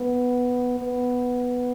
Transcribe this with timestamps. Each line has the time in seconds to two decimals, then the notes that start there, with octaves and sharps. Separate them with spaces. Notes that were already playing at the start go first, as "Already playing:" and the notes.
Already playing: B3
0.79 B3